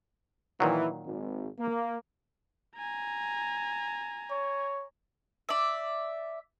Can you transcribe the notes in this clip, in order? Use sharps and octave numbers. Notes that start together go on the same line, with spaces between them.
A#2 D#3 E3 F#3
G#1
A#3
G#5 A#5
C#5
D5 E5